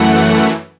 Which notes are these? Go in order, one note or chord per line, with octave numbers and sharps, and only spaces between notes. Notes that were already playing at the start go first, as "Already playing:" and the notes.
Already playing: F#2 E3 A3 F#5